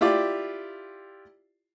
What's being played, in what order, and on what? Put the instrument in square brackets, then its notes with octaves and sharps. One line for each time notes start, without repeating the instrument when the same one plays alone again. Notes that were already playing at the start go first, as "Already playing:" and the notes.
[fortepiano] E4 F4 G4 D5